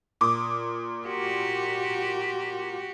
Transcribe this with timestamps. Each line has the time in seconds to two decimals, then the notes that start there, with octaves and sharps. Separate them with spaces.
0.21 A#2 D6 D#6
1.07 F#4 G4